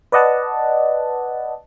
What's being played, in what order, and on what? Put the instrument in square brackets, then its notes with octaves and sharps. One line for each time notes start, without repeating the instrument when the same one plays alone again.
[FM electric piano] B4 D5 D#5 F#5 A5